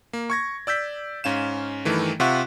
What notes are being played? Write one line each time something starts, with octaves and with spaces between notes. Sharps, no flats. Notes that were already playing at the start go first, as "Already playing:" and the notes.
A#3
C#6 G#6 A#6
D5 E6 G6 B6
G#2 C#4 F5 E7
G2 D#3 E3 A3
C3 F4 E5 F#5 C#6 F#6